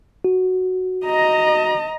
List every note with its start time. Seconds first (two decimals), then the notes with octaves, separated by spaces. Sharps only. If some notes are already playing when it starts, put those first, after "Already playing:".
0.24 F#4
1.05 D#5 A#5